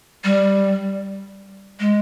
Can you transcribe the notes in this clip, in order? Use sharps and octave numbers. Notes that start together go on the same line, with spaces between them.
G3
G#3